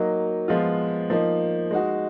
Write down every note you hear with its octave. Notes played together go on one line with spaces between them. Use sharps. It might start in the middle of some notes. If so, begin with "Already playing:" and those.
Already playing: F#3 A#3 D#4
F3 G#3 B3 F4
F3 A#3 D#4
G#3 D#4 F#4